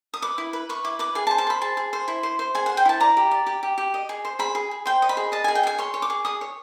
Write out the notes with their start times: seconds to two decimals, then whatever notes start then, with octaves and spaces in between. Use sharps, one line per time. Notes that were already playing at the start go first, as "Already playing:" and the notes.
0.14 D#6
0.22 B4 D6
0.38 E4
0.53 B4
0.69 B4 C#6
0.85 E4 D6
0.99 B4 D6
1.15 G#4 G#5
1.27 A5
1.31 C5
1.38 A5
1.47 C5 B5
1.61 G#4 A5
1.77 G#4
1.93 C5
2.08 E4
2.23 C5
2.39 C5
2.55 G#4 G#5
2.66 C5 F#5
2.77 G5
2.85 E4 A5
3.00 D5 A#5
3.17 G4
3.31 D5
3.46 G4
3.63 G4
3.78 G4
3.94 D#5
4.09 G#4
4.25 C5
4.39 G#4 B5
4.55 G#4
4.71 G#4
4.86 C5 G5
5.02 D#5
5.09 B5
5.17 G#4
5.32 D#5 A5
5.44 G#4 G#5
5.55 G5
5.63 G#4 G#5
5.78 C#5 C6
5.94 C#5
6.02 D6
6.10 G#4
6.25 G#4 D#6
6.41 C#5